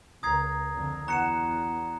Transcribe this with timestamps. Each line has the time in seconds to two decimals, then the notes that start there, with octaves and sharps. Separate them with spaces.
0.23 C#2 A#4 A#5 D#6 G#6 C7
0.76 F2 D3
1.08 E2 B2 F#4 F#5 A#5 C#7 E7